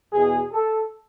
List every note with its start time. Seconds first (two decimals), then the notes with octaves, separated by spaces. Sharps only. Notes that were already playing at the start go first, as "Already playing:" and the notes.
0.11 E2 B2 G#4
0.51 A4